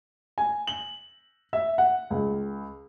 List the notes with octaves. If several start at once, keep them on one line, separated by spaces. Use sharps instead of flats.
G#5
F#7
E5
F#5
C#2